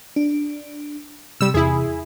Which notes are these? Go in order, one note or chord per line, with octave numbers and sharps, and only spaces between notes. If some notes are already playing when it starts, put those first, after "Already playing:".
D4
C3 G3 E6
E2 C3 E4 G#4